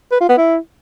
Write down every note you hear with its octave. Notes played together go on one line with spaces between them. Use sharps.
B4
F4
B3
E4